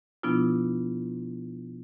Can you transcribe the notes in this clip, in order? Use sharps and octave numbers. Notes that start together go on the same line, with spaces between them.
B2 F3 B3 D4 E4 F4